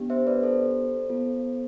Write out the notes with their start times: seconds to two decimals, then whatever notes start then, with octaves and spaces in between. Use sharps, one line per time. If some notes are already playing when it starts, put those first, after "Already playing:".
Already playing: B3 D4 G4
0.10 C5 E5
0.27 B4 D5
0.43 A4 C5
1.10 B3 F4 A4